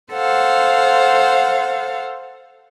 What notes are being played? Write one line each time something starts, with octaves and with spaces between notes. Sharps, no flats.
A4 C5 F5 F#5